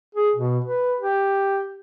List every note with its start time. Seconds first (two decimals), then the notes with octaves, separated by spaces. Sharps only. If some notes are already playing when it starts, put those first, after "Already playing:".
0.15 G#4
0.35 B2
0.64 B4
1.00 G4